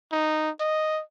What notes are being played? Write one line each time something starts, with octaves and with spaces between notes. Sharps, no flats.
D#4
D#5